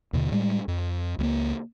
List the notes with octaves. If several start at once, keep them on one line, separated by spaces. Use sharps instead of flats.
D#2 B2 D3
A2 G3 G#3
F2
C#2 A3 A#3